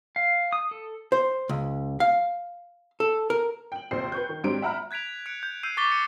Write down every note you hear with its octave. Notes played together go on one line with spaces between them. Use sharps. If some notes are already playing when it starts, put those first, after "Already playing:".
F5
D#6
A4
C5
C#2
F5
A4
A#4
G5 F#7
A#1 D#2 C3 C5 C7
B4 C#6 G6
D#3
G#2 F#3 C4 D4 G4 D7
E5 F#5 A#5 B5 F6
F#6 G#6 B6 D7 F7
F#6 C#7 D7
G6
E6 G6 C7 D#7
C#6 D6 A6 B6 G7
A6 C#7 D#7